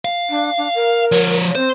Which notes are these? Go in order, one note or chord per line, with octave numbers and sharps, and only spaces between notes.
F5
D4
D4
A#4
F3 C#5
C4 C5